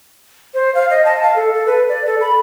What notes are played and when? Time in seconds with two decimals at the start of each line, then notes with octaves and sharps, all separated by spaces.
0.54 C5
0.75 F5
0.90 D#5
1.05 A5
1.23 F5
1.36 A4
1.54 A4
1.67 B4
1.89 D5
2.06 A4
2.21 B5